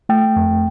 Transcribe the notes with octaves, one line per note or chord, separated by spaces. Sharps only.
A3 G5
F2